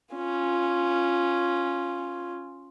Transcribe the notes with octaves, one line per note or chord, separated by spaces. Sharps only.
C#4 F4